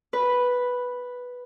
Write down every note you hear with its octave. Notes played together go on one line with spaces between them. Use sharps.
B4